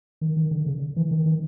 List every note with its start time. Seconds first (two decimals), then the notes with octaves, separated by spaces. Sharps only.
0.21 D#3
0.37 D#3
0.51 D3
0.66 C#3
0.96 E3
1.11 D#3
1.26 D#3